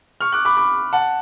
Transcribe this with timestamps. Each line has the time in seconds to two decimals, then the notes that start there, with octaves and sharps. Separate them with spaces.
0.21 C#6 F6
0.32 D6 F#6
0.45 B5 D6
0.57 B5 D6
0.93 F#5 A5